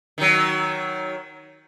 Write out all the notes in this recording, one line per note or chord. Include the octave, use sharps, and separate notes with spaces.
D#3 F#3